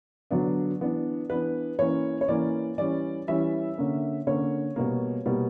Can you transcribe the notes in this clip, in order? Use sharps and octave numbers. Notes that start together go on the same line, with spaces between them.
D3 F#3 B3 D4
E3 B3 D4
E3 B3 D4 B4
E3 A#3 C#4 C#5
C#5
E3 A#3 C#4 D5
E3 G3 C#4 D5
E3 G3 C#4 E5
D3 A#3 C#4
D3 A#3 C#4 C#5
B2 G3 A#3
B2 G3 A#3